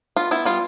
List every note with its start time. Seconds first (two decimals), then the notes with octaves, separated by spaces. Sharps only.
0.16 B3 F4
0.31 B3 E4
0.45 G3 F4